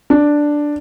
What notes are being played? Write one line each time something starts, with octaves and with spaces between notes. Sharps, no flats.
D4